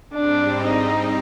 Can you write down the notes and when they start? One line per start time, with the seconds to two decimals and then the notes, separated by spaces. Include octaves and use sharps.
0.15 G#2 G3 C4 D4
0.64 D#4